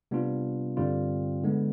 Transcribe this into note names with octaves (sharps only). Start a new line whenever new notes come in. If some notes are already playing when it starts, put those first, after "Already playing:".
C3 G3 B3 D4 F4
G2 D3 G3 C4 F4
D3 G#3 B3